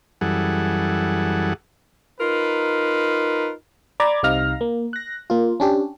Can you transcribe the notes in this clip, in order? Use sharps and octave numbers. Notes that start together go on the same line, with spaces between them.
F#2 E3 G3 G#4 A4 F#5
D#4 F4 A#4 B4
D5 A#5 B5 D6 G#6 A6
C2 C3 D#4 F5 F6 A#6
A#3
F#6 A#6
A#3 F4
C#4 D4 G4